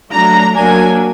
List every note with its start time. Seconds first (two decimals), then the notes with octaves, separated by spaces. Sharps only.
0.13 F#3 A3 D4 A#5
0.55 F#3 A#3 D4 G#5